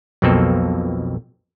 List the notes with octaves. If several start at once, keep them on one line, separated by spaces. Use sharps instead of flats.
B1 F2 B2 A#3 C4 A4